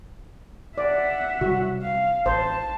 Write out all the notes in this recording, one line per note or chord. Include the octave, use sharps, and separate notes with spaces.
D5 E5 F#5
C3 G3 F#4
F5
A1 C5 A5